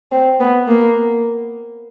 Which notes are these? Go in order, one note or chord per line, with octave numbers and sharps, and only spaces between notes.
C4
B3
A#3